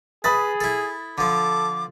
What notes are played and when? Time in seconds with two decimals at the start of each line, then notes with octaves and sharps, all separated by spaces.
0.24 G#4 B4 B5 D#6 A6
0.61 E4 A4
1.18 D3 F3 A4 D6